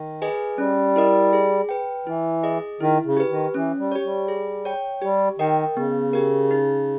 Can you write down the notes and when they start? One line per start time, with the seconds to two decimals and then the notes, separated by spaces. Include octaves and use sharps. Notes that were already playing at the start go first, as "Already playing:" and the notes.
Already playing: D#3
0.22 G#4 B4 D#5 G#5
0.58 G3 C#4
0.96 E4 A#4 D#5
1.33 G#4
1.69 B4 G5
2.06 E3 E4
2.43 G#4 D#5
2.80 D#3 E4
3.05 C#3
3.17 G4 B4
3.30 D#3
3.54 E3 C#4
3.78 G3
3.92 G4 C#5
4.04 G3
4.28 G#4
4.65 C#5 G5
5.02 G3 G4
5.39 D#3 A#4 D#5 G5
5.76 C#3 B3
6.13 G4 A#4
6.51 D#4